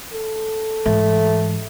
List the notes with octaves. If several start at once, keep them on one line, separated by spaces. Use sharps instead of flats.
A4
G#2 E3 A3